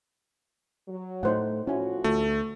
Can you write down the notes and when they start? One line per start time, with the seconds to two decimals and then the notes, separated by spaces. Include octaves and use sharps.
0.88 F#3
1.23 A2 A3 D#4 C5 F#5
1.67 A2 F3 C#4 E4 F#4 G#5
2.04 D2 A3